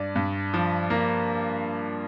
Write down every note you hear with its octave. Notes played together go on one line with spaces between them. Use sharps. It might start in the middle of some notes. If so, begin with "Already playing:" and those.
Already playing: G2 D5
G2
F3
A#3